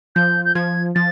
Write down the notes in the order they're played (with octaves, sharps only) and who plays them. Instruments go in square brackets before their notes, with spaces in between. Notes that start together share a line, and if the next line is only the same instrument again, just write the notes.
[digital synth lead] F3 [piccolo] G6
[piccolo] G6
[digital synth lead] F3 [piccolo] G#6
[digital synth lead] F3 [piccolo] A6